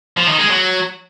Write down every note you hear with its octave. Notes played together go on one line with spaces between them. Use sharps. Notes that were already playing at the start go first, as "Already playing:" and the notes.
F3
D#3
G#3
F#3